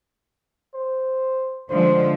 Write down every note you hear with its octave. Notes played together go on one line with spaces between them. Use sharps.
C5
D3 F3 G#3 C5